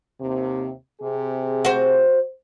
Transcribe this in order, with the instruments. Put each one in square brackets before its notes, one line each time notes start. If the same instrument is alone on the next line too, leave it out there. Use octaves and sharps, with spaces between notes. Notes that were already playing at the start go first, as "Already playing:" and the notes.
[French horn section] D#2 C3
C3 G#4
[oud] F#4 C5